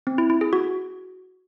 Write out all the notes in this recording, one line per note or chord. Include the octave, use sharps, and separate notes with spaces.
C4
E4
E4
G#4
F#4